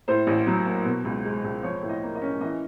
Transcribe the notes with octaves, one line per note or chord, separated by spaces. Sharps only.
A2 C5
A1
F#3
A#3
B2
C#2
G#3
C#2
F3 C#5
A2
D#5
A#3
D#5
C#4
E3 D#5